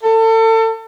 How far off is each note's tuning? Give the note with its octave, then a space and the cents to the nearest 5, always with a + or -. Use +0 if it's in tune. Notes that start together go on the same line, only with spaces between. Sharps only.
A4 +30